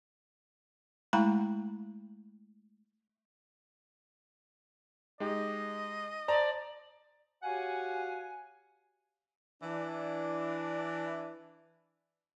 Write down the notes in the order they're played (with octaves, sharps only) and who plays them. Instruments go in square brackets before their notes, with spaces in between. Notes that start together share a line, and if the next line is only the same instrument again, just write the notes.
[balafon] G#3 A3 E4 G5 A#5 B5
[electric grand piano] G#3 D#4 G4 [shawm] D#5
[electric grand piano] C5 A5 A#5 [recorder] D5
[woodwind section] F#4 G4 C#5 F5 F#5 G#5
[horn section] E3 D4